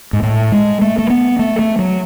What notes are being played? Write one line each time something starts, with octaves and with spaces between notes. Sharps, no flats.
G#2
A2
G#3
A3
A3
B3
A3
A3
F#3